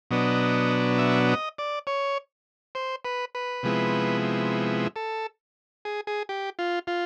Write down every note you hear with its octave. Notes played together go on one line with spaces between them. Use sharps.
B2 F#3 B3 D4 D#5
E5
D#5
D5
C#5
C5
B4
B4
C3 F3 G#3 B3 E4
A4
G#4
G#4
G4
F4
F4